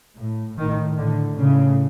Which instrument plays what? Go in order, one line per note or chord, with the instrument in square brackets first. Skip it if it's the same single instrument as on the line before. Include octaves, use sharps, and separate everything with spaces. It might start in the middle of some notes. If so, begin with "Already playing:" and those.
[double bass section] A2
A2 D#3
A2 D3
A2 C#3